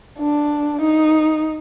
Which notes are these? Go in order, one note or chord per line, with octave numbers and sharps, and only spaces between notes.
D4
D#4